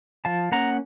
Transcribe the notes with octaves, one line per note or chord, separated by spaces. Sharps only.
F3 F5 A5
A#3 C#4 F#5 A#5